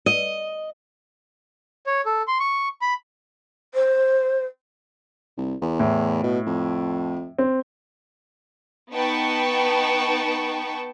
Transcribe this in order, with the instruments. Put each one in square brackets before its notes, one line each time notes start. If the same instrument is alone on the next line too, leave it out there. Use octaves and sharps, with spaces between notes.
[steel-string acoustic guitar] D#5
[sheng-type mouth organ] C#5
A4
C6
C#6
B5
[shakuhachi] C5
[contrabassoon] C2
E2
[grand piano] A2
[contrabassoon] B2
F2
[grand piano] C4
[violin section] B3 D#4 B4 G5 A5 C#6